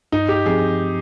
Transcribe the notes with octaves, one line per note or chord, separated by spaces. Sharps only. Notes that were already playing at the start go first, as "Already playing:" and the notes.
G2 D#4
G4
F3 C4 G#4